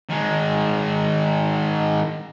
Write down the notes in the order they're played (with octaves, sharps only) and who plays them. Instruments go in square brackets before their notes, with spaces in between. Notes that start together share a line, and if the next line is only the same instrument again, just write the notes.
[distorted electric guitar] D#3 G#3